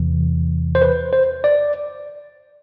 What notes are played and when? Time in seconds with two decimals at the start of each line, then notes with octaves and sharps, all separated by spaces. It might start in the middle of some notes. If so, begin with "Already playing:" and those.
Already playing: E2 C3 E3
0.75 C5
0.82 B4
1.13 C5
1.44 D5